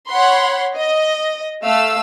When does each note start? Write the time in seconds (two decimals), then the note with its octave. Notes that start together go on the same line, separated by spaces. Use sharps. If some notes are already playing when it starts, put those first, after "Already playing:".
0.11 C#5 F#5 B5 C6
0.77 D#5
1.63 A3 F5 E6